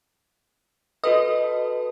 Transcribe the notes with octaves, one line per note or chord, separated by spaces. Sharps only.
F#4 A4 B4 D#5